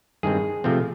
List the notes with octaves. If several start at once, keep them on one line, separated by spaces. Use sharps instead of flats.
G2 D#3 G#3 C4 G#4
C3 F3 A3 C4